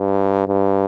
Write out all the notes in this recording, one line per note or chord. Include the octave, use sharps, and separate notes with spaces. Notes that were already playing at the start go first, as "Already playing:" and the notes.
Already playing: G2
G2